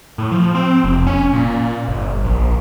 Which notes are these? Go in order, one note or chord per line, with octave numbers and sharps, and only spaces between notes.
A2
F3
C4
F1
C#4
A#2
G1
A#1